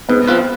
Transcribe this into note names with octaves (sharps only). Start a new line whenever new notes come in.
G#2 B3
F3 C4 F4 B4